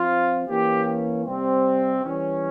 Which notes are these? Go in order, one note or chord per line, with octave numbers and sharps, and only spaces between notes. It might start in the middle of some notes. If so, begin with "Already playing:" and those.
Already playing: F3 C4 F4
E3 A#3 C#4 G4
C3 G3 C4
E3 G3 C#4